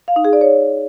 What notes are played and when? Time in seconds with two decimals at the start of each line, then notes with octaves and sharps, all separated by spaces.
0.08 F5
0.16 D#4
0.25 G#4
0.33 D5
0.41 C#5